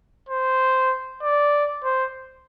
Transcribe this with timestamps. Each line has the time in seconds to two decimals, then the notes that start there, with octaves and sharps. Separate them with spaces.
0.29 C5
1.23 D5
1.84 C5